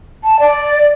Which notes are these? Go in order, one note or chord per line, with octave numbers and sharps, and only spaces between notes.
A5
D5